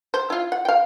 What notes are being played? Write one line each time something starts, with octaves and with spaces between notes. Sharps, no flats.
C5
E4 F4
F#5
F5 G5